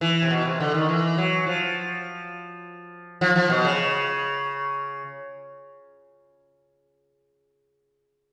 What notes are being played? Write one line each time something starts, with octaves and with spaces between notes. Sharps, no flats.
E3
C3
B2
C3
D3
D#3
E3
F#3
F3
F3
F3
B2
C#3